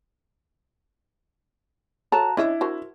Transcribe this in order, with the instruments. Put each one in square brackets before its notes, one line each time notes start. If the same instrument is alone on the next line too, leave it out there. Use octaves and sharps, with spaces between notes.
[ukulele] F#4 A5 A#5 [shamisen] A4 C#5
[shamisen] C#4 D#5 E5 [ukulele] D4 [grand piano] E4
[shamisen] F#4 A#4 C5